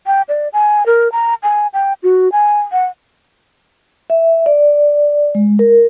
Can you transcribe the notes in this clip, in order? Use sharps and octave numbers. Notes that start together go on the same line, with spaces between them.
G5
D5
G#5
A#4
A#5
G#5
G5
F#4
G#5
F#5
E5
D5
G#3
A#4